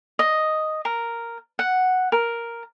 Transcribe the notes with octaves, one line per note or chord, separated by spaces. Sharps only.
D#5
A#4
F#5
A#4